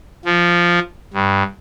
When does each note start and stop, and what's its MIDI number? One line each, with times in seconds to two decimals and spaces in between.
0.25 0.79 53
1.13 1.43 43